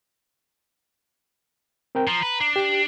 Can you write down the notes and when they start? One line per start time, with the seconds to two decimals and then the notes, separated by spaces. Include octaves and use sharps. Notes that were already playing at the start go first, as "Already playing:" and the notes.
1.95 C4 A#4 G5
2.07 F3 A#5
2.23 B4
2.40 D4
2.56 G4